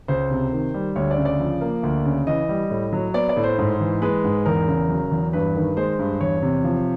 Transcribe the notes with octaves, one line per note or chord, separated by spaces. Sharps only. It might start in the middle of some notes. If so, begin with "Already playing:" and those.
C#2 C5
C3
D#3
G3
D2 C#5
D5
C#3
D5
F3
A#3
D2
C#3
E3 D#5
G3
A2
F#3
B3 D5
D5
A2
C5
G#2
E3
G#3 B4
G#2
E2 A#4
C#3
F#3
E2
G2 B4
D#3
G#3 C5
G2
E2 C#5
C3
F3